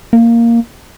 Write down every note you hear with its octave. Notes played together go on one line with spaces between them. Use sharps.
A#3